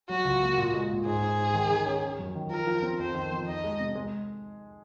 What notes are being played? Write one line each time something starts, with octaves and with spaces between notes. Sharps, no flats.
F#3 F#4
C#2
A#3
A#2
G#3
A#2
G#2 G#4
G#2
G#2
D#3
D#3
C#4
C#4
F#2
D#3
F3 A#4
F3
C4
F2 C5
D#3
F2
D#4 D#5
G#3
C3
G#3